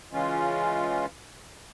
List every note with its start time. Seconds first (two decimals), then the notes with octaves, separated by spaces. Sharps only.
0.11 C#3 E3 G#3 C#4 F4